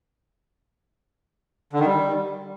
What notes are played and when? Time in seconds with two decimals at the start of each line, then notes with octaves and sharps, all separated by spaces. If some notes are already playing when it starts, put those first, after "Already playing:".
1.73 D3
1.79 D#3
1.86 G3